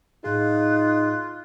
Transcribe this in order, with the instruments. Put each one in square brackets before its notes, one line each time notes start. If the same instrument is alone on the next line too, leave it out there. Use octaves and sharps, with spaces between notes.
[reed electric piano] A2 G#4 [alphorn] D#4 [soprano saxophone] F4 [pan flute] F#6